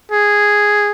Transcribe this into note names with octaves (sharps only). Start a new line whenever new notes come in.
G#4